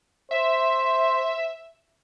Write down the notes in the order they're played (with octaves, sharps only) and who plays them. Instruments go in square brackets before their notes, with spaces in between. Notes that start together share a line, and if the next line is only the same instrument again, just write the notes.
[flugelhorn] C5 [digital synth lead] E5